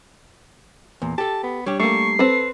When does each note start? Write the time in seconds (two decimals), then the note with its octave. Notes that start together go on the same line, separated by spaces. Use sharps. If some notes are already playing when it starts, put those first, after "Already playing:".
1.02 E2 A#2
1.18 G4 A4 A5
1.44 B3
1.66 G3 D4 G4 C#5
1.80 A3 A#3 C#6 C7
2.19 C4 A4 B4